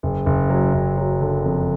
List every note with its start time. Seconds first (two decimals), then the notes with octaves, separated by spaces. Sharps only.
0.03 F#1
0.26 F#1
0.50 F#3
0.74 F#1
0.98 F#3
1.21 D3
1.46 F2